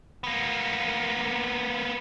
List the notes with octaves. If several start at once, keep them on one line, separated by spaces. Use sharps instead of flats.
A#3 B3